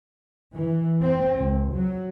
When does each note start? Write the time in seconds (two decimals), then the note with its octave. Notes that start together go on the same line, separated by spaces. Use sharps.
0.54 E3
1.02 C4
1.36 C#2
1.73 F#3